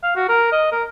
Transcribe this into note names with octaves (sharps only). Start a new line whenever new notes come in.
F5
F#4
A#4
D#5
A#4